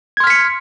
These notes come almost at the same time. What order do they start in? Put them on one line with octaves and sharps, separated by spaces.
G#6 C6 F6 B6 C#7